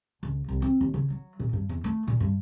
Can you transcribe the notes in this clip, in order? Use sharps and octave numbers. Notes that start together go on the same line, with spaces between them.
C#2
C2
C4
D#2
C#3
F#3
A#2
G2
E2
A3
A#2
G2